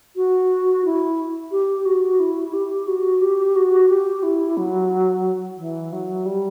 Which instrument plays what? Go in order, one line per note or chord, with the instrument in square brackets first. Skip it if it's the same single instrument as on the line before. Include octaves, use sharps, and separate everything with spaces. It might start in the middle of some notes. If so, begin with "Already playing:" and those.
[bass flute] F#4
E4
G4
F#4
E4
G4
F#4
G4
F#4
G4
E4
F#3
E3
F#3
G3